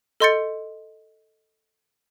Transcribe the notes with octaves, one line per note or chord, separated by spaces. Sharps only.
A4 D#5 C6 G6 A6 C#7